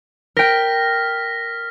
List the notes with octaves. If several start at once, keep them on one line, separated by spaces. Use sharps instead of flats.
A#4 G5 F6 A#6 B6